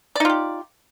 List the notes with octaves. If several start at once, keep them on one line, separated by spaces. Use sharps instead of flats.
D#4 F4 G4 D5